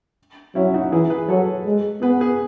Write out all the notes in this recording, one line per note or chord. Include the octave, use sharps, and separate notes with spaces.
F#3 C#4 E4
D#4 F#4
E3 E4 G#4
G#4 B4
F#3 A4 C#5
G#3
B3 G#4 B4
G#4 B4